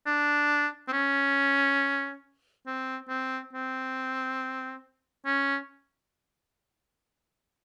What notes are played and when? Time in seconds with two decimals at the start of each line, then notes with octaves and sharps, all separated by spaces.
0.06 D4
0.88 C4
0.92 C#4
2.66 C4
3.09 C4
3.53 C4
5.26 C#4